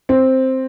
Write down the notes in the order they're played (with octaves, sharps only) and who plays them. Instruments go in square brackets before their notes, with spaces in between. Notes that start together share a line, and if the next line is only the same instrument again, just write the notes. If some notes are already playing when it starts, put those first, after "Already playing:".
[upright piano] C4